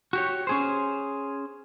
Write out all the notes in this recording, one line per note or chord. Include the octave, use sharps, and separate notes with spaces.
F#4 G4 C#5
C#4 G#4 C5